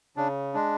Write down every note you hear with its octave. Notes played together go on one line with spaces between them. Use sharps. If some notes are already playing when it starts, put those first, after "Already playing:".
C#3 D4
G#3 D4